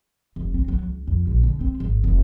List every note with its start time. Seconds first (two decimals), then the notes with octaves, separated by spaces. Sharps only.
0.36 F1
0.54 C4
0.68 F#3
0.83 C#2
1.07 F2
1.27 A#1
1.43 D3
1.61 C4
1.80 G#1
2.04 F1